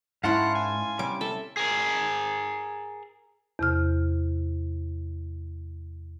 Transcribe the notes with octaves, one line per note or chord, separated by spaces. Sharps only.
G#2 C#4 E4 A#4 F5 F#5 A5 C6
G#5
C3 G3 C#4 D6
A4 E5
G#4 A#4
E2 C3 F6